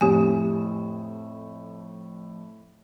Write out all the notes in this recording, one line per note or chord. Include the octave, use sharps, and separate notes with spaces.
F2 A2 G4 G#5